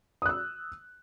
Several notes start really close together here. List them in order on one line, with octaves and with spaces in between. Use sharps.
D#6 F#6 E6